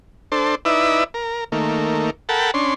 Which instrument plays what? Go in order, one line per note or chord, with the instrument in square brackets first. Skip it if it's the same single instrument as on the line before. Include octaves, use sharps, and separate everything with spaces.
[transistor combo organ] D4 A4 C5
D#4 E4 B4 D5 E5
A#4
D#3 A3 A#3
A4 A#4 F#5 G5 A5 B5
C#4 D4 C6